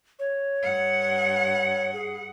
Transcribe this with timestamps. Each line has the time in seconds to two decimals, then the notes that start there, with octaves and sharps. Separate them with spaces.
0.19 C#5
0.62 G2 F#5
1.94 G#4